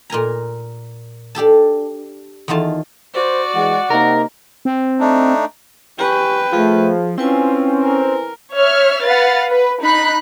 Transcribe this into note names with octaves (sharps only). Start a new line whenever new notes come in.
A#2 A#4 G#5 A#5
D4 G4 A4 A5
E2 D#3 A#3 F4 A5
F#4 C5 D5
E3 G#3 F#5
C3 A#3 D#4 A#4
C4
A3 D4 D#4
G4 B4 G5 G#5 C#6
F3 A3 F4 G#4
C4 C#4 E4 F4 B4 G#5
A#4
C#5 E5 F6
B4 F5 F#5 A6
B4
D#4 B5 F#6